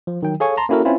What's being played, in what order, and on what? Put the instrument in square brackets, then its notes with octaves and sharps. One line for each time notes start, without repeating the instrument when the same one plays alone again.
[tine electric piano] F3
D#3 F#3 G5
G#4 A4 C#5 F5 G#5 C#6
A5 A#5 C6
A#3 C#4 E4 F#4 A4 A#4
C4 C#4 E4 F4 B4